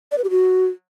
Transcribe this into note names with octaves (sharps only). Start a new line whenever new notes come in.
D5
B4
G4
F#4